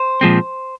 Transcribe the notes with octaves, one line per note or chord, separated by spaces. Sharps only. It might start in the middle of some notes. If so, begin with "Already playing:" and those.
Already playing: C5
A#2 F3 G#3 C4